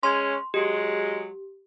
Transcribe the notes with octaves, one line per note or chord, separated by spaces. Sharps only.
G#3 C#4 C6
F#3 G#3 G4